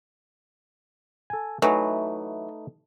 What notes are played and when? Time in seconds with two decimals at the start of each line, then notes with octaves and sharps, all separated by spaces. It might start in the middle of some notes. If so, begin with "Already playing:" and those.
1.30 A4 G#5
1.62 E3 F#3 A3 D#4 B4